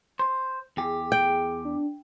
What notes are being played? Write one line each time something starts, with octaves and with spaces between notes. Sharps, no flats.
C5
E2 G4 G#4
G5
D4